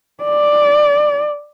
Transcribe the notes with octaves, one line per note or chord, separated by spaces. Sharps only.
D5